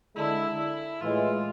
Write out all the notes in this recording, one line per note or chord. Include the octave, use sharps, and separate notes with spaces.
D3 G#3 D4 E4 A4
E4
A2 E3 G#3 F4